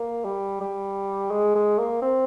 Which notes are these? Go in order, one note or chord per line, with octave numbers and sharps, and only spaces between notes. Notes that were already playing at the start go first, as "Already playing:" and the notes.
Already playing: A#3
G3
G3
G#3
G#3
A#3
C4